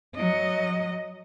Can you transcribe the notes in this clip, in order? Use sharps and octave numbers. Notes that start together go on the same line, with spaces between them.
F#3 D#5